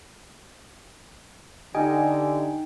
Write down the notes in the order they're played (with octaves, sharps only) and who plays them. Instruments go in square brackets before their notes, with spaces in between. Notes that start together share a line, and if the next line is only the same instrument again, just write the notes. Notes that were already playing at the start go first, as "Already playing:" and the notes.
[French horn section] D3 [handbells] D#4 G5 [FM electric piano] G4 D#5 G#5